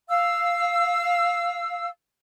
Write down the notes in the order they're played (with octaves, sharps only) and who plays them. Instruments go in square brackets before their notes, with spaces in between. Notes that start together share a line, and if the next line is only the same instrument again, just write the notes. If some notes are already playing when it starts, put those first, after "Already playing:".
[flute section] F5 E6